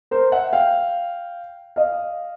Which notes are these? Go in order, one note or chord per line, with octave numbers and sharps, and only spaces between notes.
A#4 C5
E5 F#5
F5 G5
D#5 F5